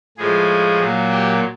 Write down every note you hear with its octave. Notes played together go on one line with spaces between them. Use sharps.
A2 F3 G#3 G#4
A#2 F#3 A#3
G4